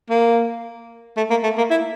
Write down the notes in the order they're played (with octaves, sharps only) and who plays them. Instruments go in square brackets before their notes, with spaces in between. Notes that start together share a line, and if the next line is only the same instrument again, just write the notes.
[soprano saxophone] A#3
A3
A#3
A3
A#3
E4